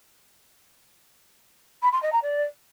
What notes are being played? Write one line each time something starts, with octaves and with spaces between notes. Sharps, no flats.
B5
C6
D#5
A#5
D5